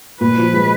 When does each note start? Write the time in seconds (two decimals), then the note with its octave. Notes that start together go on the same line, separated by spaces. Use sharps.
0.21 A#2 B4
0.38 F3
0.53 G#3